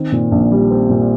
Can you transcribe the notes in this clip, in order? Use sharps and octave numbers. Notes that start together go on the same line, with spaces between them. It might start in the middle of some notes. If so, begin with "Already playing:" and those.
Already playing: D#3 C4
A#2
A#1
G3
C4
A#2